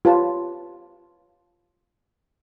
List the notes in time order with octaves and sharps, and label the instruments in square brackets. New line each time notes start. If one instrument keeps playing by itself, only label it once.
[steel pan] F4 G4 B4 C#5 A5